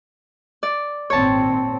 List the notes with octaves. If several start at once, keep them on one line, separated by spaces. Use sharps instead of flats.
D5
G#1 A#2 C4 C#5 A5